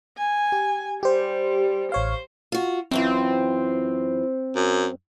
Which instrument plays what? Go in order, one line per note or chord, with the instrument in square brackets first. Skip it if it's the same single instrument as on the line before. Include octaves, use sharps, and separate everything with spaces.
[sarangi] G#5
[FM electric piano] G4
[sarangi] G3 [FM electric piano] G4 C5
[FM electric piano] A1 C#5 F5 [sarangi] C5
[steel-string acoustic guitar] F4 F#4
[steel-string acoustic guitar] F#2 E3 F4 [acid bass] C4
[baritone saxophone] F#2